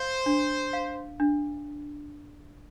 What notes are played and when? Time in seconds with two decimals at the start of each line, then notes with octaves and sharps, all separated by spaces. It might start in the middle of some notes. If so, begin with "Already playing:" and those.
Already playing: C5 F5
0.26 D4
0.73 F5
1.20 D4